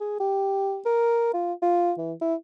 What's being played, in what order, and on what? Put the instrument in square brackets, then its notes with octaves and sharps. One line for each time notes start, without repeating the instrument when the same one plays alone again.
[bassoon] G#4
G4
A#4
F4
F4
E3
E4